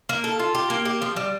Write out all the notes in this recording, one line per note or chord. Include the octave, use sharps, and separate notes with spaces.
A#3
A4
F4
G4
A#3
G4
F3
G3